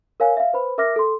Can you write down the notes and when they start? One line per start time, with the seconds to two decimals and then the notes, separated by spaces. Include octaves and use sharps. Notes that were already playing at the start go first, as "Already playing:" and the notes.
0.20 A#4 C#5 F5 G#5
0.37 E5 F5
0.53 B4 C5 B5
0.78 A#4 E5 D6 F6 A#6
0.96 A4 C6